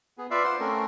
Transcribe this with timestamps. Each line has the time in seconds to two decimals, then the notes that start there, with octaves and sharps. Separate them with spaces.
0.18 B3 G#4
0.31 F4 B4 D5 E5 F5
0.44 C5 F#5 C6
0.60 A3 C4 C#4 A#4